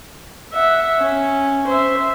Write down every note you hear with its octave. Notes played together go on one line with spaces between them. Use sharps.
E5 F#5
C#4
C5 E5